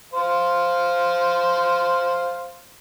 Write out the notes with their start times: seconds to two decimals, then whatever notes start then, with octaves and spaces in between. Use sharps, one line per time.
0.13 C5 F5